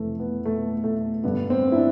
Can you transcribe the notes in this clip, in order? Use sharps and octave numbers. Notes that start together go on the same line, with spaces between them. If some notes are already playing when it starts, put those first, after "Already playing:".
Already playing: F2 C3 E3 A3
B3
A3
A3
G2 D3 B3
C4
E4
D4